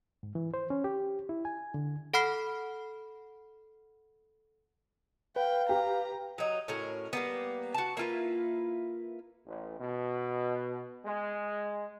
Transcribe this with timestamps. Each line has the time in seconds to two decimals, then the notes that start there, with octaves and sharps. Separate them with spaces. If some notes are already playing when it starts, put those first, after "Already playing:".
0.23 G#2
0.35 E3
0.54 C5
0.70 C#4
0.84 G4
1.29 E4
1.45 G#5
1.74 D3
2.14 A4 F#5 B5 F6 C7
5.36 B4 F5 G5
5.69 G4 A#5
6.38 F#3 D#4
6.68 A2 C#4 F#4 A#4
7.13 G3 A#3 B3
7.74 F#4 A5
7.97 A#3 E4 F4 B4
9.46 A1
9.80 B2
11.05 G#3